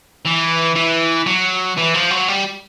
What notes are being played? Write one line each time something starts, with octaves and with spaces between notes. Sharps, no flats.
E3
E3
F#3
E3
F3
F#3
G3